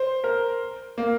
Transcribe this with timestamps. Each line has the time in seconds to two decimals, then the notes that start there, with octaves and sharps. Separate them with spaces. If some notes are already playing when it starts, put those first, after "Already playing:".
Already playing: C5
0.24 A#4
0.98 A#3